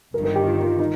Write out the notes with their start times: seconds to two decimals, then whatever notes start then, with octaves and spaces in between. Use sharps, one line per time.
0.14 G1 G2 D#3 A#4
0.25 A#4
0.36 G4
0.46 F4
0.64 F4
0.79 D#4